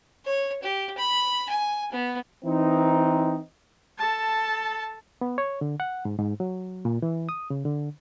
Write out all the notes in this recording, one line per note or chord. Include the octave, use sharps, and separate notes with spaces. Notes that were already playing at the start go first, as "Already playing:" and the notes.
C#5
G4
B5
G#5
B3
E3 C4 D#4
A4 A5
B3
C#5
D3
F#5
G#2
G#2
F#3
A#2
E3
D#6
C#3
D3